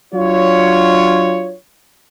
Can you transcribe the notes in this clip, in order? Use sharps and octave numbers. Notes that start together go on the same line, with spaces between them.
F#3 D4 F4 C#5